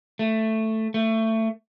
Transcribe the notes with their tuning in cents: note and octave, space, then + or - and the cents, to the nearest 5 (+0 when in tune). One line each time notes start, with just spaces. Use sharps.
A3 +5
A3 +20